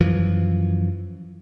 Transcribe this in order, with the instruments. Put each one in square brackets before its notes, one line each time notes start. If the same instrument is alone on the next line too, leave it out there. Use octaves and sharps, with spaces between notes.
[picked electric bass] F#2 E3 F3